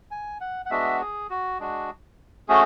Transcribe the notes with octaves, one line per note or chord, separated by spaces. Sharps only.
G#5
F#5
F#5
G#3 B3 D4 F#4 E5
G#4
F#4
G#3 D4 F#4
A3 C#4 F#4 G#4